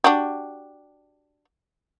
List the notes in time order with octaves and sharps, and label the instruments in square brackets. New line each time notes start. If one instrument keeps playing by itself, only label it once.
[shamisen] D4 F#4 G4